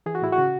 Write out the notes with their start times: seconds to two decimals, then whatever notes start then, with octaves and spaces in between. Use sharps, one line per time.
0.06 E3 G#4
0.15 F#4
0.22 A2 E4
0.32 F#4
0.38 C#3